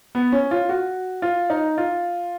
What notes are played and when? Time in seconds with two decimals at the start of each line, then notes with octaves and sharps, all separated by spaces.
0.15 B3
0.32 C#4
0.51 F4
0.69 F#4
1.22 F4
1.50 D#4
1.78 F4